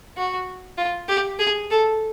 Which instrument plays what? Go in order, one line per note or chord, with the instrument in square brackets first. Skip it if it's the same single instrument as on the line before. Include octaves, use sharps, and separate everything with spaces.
[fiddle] F#4
F4
G4
G#4
A4